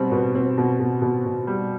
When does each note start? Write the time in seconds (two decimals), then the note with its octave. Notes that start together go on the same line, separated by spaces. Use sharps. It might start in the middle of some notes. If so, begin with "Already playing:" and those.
Already playing: B2 G3 C4
0.12 B2 B3
0.35 B2 C4
0.58 B2
0.79 B2
1.02 B2
1.25 B2
1.47 G3